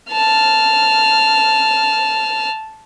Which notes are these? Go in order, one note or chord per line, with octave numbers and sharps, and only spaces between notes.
A5 F6